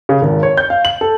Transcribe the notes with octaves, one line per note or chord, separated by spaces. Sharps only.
C#3
G#1
C#5
G6
F5
F#7
A4